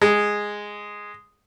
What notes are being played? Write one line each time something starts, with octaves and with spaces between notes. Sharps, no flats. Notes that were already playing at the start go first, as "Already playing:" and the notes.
G#3